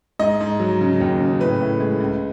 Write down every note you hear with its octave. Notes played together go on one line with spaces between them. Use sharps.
G#2 D#5
G#2
F#3
C#3
D#2
C#3
A2 B4
A2
G#3
C#2